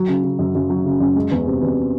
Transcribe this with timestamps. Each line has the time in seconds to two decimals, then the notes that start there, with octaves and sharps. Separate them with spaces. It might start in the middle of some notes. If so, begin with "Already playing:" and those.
Already playing: F#3
0.09 C#3
0.24 C#3
0.39 F#2
0.55 F#2
0.70 F#3
0.85 C#3
1.00 F#2
1.16 G#3
1.31 E2
1.47 C3
1.62 E2